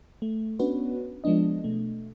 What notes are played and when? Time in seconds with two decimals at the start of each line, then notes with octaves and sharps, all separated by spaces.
0.22 A3
0.59 B3 C#4 D4 F#4 B4
1.24 F3 G#3 B3 D4 D#5
1.64 B2 A3